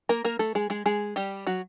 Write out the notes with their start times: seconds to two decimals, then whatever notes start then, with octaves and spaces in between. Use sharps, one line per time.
0.09 A#3 A#4
0.25 A#3 A#4
0.39 A3 A4
0.55 G#3 G#4
0.70 G#3 G#4
0.86 G#3 G#4
1.16 G3 G4
1.47 F#3 F#4